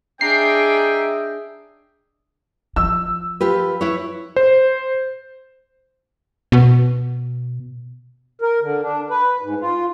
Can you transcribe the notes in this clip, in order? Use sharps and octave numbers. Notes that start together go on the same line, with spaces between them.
D4 G#4 D#5 E5 G5 A#5 C7
F3 E6
F4 G4 B4
E4 B4 C#5
C5
B2
A#4
D3
D4
B4
G#2
F4